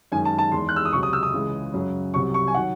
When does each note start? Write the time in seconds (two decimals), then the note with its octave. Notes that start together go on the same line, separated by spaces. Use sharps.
0.12 F#2 D#3 G#3 G#5
0.25 A5
0.39 A5
0.52 E2 D#3 G#3 C6
0.69 F#6
0.76 E6
0.85 D#6
0.92 C#2 C3 F#3 C#6
1.03 D#6
1.13 E6
1.23 D#6
1.33 C#2 C#3 E3 G#3
1.73 F#2 C#3 F#3
2.14 C2 C3 F#3 C#6
2.34 C#6
2.47 G#5
2.55 D#3 F#3 F#5